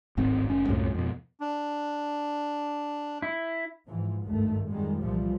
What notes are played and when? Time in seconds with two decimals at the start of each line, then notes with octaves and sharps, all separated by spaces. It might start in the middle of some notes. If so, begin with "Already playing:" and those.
0.17 D1 G#1 C4
0.49 F1 C#4
0.69 C2 F#2 A2
0.94 F2 B2
1.40 D4
3.22 E4
3.88 G#2 E3 F3
4.26 G#1 D2 G2 D#3 A3
4.70 F2 G#2 D#3 G3 G#3
5.01 C2 A#2 E3 F3 G3